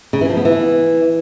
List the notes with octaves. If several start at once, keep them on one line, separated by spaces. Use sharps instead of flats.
C#3
E3
F3
B3
E3